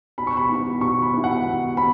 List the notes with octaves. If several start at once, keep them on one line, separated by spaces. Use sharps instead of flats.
B2 B5
C#6
B5
B3 E4
B2 C#6
B5
B3 E4
F#5
B2
B3 B5